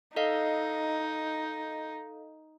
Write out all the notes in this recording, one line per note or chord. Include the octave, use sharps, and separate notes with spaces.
D#4 A4 D#5 F5